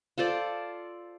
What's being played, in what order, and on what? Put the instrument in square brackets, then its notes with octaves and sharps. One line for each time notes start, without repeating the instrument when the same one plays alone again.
[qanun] F4 A4 C5 D5